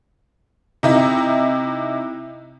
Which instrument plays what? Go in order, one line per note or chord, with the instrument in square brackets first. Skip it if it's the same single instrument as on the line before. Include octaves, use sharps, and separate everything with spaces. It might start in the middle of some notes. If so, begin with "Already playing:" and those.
[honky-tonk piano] C3 D#4 E4